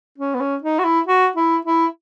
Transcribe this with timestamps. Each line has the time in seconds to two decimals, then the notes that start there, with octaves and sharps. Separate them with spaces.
0.18 C#4
0.35 B3
0.41 C#4
0.62 D#4
0.79 F#4
0.84 E4
1.07 F#4
1.36 E4
1.65 E4